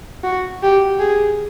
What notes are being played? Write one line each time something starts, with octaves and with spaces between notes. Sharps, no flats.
F#4
G4
G#4